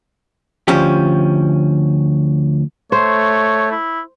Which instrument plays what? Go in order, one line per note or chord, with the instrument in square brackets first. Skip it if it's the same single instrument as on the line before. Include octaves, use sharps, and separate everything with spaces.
[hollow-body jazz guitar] D2 F3 C#4 G4
[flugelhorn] A3 [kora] C5 [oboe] C#5
[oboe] E4